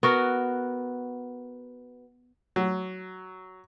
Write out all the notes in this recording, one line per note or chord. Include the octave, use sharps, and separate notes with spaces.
B3 F#4 A#4
F#3